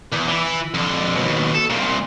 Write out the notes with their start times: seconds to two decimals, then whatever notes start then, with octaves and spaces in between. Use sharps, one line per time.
0.12 E2
0.28 E3 E4
0.74 F2 D3
1.16 D#2 B2
1.54 A4
1.70 C2 A#2